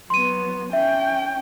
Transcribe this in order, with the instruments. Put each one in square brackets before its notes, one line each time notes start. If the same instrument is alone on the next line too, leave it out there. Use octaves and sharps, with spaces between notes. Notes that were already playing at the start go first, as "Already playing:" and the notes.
[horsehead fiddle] F#3 B3 [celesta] C6 D#7
[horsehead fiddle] C#4 G5 [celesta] E5